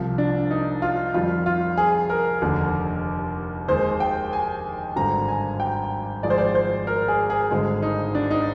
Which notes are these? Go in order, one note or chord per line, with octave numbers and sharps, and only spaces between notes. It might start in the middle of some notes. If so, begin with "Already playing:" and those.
Already playing: C2 C3 F3
D4
D#4
F4
F2 D#3 G3 F4
F4
G#4
A#4
F1 D#2 D3
D#2 D#3 G#3 C5
G5
G#5
G#1 G2 D3 G3 A#5
G#5
G5
G#1 G#2 F3 G#3 D5
C5
D5
C5
A#4
G#4
G#4
G#1 G2 D3 G#3
D#4
D4
D#4